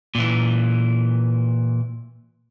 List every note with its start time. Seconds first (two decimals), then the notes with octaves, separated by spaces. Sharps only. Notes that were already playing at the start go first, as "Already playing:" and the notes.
0.15 A#2 E3